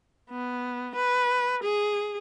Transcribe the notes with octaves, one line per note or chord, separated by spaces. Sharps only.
B3
B4
G#4